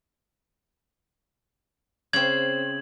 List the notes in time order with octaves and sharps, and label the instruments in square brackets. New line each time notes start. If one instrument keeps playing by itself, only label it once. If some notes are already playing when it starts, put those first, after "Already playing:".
[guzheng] C#3 C4 [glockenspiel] G#6 F#7